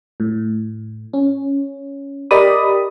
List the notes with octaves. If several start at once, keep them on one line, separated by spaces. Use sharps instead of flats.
A2
C#4
G4 A#4 D5 D#5 B5 D#6